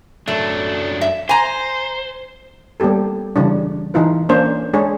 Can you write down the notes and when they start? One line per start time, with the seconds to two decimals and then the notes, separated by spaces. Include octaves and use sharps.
0.28 F#2 F#3 A3 D4
1.01 E5
1.29 C5 G#5 A#5
2.80 G3 A#3 B3 G4 A4
3.36 C#3 E3 G3 D4
3.94 E3 D#4 F4 B4
4.29 A#3 C#4 D4 C5
4.73 G#3 D4 G#4 C#5